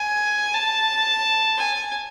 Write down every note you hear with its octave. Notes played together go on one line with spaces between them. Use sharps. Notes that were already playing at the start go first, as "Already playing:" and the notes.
Already playing: G#5
A5
G#5